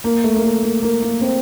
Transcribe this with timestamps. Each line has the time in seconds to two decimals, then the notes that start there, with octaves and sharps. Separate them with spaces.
0.04 A#3
0.24 A3
0.36 A#3
0.44 A3
0.63 A#3
0.83 A#3
1.02 A#3
1.21 C4